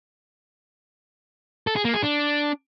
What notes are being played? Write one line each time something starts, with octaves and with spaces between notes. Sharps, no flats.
A4
G#4
A#3
G#4
D4